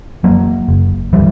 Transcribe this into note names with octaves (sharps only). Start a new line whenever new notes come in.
F#2 F#3 A#3
F#1
D3 E3 G3